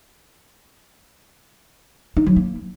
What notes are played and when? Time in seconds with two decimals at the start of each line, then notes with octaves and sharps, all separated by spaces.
2.17 D#4
2.26 F#3
2.36 A#3